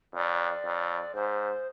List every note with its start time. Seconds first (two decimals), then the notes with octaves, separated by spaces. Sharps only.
0.14 F2 D5
0.65 F2
1.15 G#2 C5